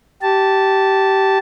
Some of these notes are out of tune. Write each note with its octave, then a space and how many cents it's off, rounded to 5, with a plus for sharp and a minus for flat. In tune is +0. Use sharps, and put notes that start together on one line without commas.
G4 -20 A5 +0